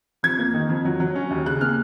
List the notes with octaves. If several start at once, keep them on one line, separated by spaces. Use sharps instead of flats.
F2 G#6
A#3
D#3
F2
F#3
F#3
C#4
D#2
C#3 F#6
A#3 F6